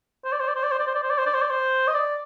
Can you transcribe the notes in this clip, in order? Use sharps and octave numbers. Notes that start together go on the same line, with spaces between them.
C5
D5
C5
D5
C5
D5
C5
D5
C5
D5
C5
D5
C5
D5
C5
D5
C5
D#5
D5